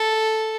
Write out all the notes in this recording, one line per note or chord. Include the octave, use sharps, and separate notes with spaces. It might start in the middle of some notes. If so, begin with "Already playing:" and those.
Already playing: A4